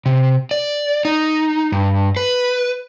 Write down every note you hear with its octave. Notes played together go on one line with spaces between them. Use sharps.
C3
D5
D#4
G2
B4